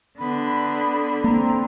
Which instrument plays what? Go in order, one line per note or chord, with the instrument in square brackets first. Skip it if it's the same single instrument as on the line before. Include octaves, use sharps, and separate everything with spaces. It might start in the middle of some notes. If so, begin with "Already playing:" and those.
[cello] D3 [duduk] B3 [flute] B5
[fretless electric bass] A#3 [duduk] C4 [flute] A#5